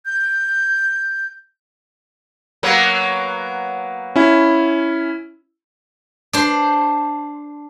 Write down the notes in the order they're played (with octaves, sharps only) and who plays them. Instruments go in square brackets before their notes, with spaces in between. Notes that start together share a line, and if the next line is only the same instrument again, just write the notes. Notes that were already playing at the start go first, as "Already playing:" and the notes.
[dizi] G6
[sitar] F#3 A#3 B3
[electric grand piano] C#4 E4
[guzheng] D4 C5